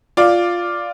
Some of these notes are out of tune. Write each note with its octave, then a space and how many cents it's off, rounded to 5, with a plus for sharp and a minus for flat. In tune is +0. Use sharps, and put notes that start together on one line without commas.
F4 +0 D5 +0